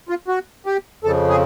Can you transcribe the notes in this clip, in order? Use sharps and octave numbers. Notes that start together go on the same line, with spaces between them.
F4
F#4
G4
F2 C#3 F3 A4
G#4